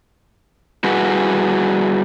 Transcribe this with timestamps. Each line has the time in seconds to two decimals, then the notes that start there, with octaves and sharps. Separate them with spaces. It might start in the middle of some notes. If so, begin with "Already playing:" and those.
0.84 G3 E4 F#4 G#4 B4 F#5